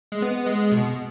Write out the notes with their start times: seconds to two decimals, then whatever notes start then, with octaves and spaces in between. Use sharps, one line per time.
0.12 G#3
0.22 B3
0.46 G#3
0.72 B2